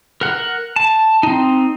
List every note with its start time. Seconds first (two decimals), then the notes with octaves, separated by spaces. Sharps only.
0.21 A#4 F#5
0.76 A5
1.23 C4 D#4